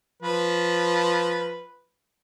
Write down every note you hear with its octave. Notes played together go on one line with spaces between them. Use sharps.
F3 B4